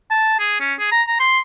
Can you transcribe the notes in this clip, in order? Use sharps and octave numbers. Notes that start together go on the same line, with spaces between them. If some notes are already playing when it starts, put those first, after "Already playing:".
A5
G#4
C#4
G#4
A#5
A#5
C6